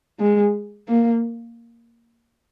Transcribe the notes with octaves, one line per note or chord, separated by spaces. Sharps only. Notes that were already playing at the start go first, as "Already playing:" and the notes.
G#3
A#3